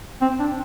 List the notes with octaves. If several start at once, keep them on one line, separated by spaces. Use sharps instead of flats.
C4
D4